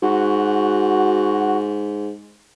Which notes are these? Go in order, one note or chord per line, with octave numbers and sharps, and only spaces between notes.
G#2 F#4